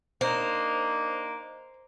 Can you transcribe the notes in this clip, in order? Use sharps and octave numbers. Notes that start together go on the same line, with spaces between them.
A#3 D4 D#4 C5